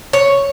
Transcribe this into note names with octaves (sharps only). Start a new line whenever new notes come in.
C#5